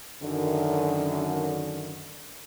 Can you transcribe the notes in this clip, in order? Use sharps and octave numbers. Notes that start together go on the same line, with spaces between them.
F#2 D3 D#3